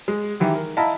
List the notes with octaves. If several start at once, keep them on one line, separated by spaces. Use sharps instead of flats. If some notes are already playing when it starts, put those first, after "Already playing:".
G#3
D#3 E3 G4
A#4
E4 D#5 F5 A5 A#5